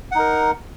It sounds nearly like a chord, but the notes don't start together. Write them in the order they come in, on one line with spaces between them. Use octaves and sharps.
F#5 D#4 A#4